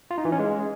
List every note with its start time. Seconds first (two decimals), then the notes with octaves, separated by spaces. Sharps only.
0.11 F4
0.18 D#4
0.25 E3
0.32 C#4
0.39 G#3